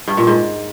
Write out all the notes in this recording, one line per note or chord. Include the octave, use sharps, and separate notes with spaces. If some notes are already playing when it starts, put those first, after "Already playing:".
G2
A#2
G#2